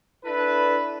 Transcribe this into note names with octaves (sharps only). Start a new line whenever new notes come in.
D4 E4 A4 B4